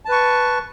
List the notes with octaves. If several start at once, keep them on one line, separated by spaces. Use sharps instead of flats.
B4 A5 C#6